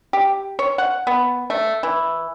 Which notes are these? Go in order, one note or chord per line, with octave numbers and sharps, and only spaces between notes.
G4
C#5
F#5
B3
A3
E3